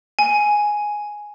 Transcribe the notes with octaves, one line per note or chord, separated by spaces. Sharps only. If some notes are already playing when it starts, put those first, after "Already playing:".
G#5